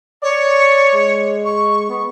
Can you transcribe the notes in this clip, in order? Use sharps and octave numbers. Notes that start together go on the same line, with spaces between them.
C#5 D5
G#3
C#6
B3